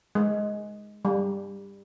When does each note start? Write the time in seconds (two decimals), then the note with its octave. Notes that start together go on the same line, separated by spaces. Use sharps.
0.15 G#3
1.05 G3